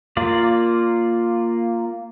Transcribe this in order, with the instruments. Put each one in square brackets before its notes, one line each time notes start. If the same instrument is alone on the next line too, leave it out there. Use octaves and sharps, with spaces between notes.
[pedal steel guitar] A#3 F4 D5